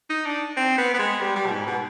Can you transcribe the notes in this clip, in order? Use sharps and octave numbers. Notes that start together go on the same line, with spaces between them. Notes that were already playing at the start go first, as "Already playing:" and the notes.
D#4
D4
C4
B3
B3
G#3
G3
G3
B2
G#2
B2